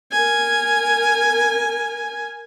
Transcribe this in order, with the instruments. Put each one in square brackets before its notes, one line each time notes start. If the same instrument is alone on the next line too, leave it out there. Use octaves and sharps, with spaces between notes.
[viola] A#4 G#5